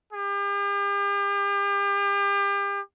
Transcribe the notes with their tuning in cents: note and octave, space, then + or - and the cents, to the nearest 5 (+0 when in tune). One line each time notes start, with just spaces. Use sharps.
G4 +40